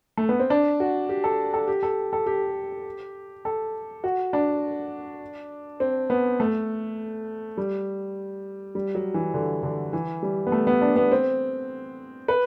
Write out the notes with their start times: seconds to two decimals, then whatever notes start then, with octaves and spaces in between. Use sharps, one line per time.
0.17 A3
0.29 B3
0.39 C4
0.50 D4
0.80 F#4
1.09 G4
1.24 A4
1.54 A4
1.68 G4
1.83 A4
2.13 A4
2.26 G4
3.45 A4
4.04 F#4
4.33 D4
5.80 C4
6.10 B3
6.40 A3
7.57 G3
8.75 G3
8.95 F#3
9.14 E3
9.34 D3
9.63 D3
9.93 E3
10.23 G3
10.47 B3
10.52 A3
10.67 B3
10.82 D4
10.96 B3
11.12 C4
12.28 B4